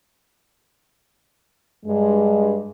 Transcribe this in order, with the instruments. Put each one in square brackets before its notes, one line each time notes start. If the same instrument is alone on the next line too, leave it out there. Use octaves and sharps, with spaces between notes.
[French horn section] G2 G#3